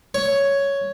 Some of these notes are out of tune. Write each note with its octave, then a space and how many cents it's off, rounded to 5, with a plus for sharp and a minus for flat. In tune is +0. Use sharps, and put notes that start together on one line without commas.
C#5 +5